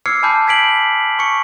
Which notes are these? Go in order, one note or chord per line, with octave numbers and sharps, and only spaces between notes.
D6 E6 F6 G#6 C7 C#7
G#5 A5 B5 D6 G6
G#6 B6 D7 F#7
C#6 C#7